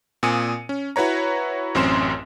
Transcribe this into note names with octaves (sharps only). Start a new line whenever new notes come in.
A#2 C4 G#5 D#6 C#7 D#7
C#4
E4 F#4 B4 C#5 A#5
A1 F#2 C4 C#4 C6 E7